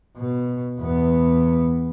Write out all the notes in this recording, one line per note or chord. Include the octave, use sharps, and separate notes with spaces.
B2
E2 B3